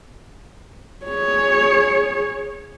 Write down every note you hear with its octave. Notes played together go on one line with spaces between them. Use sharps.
G#4 C#5